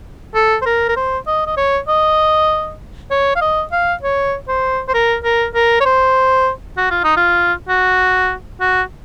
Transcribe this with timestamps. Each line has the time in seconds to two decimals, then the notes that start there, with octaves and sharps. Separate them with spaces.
0.35 A4
0.62 C5
0.66 A#4
0.89 A#4
0.97 C5
1.27 D#5
1.46 D#5
1.57 C#5
1.88 D#5
3.11 C#5
3.36 F5
3.42 D#5
3.72 F5
4.03 C#5
4.48 C5
4.88 C5
4.94 A#4
5.24 A#4
5.55 A#4
5.81 C#5
5.85 C5
6.77 F#4
6.91 F4
7.04 D#4
7.17 F4
7.69 F#4
8.61 F#4